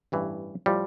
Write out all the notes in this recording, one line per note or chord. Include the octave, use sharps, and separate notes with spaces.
A1 G2 E3
A2 F3 G3